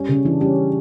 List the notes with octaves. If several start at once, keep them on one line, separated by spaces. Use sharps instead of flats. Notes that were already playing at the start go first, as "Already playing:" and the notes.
Already playing: G3 C#4
C#3
E3 D4
G3 C#4